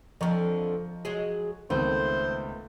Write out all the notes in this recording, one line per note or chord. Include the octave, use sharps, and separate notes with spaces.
F2 D3 F3 D#5 A#5 C#6
F#3 G#3 G#4
C#2 D#3 A3 B3 C4 B4 C5